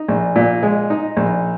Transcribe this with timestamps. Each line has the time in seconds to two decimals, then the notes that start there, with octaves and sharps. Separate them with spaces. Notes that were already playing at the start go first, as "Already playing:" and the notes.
Already playing: D#4
0.08 A#1
0.36 A#2
0.63 G#3
0.90 D#4
1.17 A#1